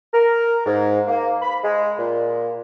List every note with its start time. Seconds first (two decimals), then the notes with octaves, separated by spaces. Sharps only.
0.14 A#4
0.66 G#2
1.08 A#3
1.42 B5
1.64 G#3
1.98 A#2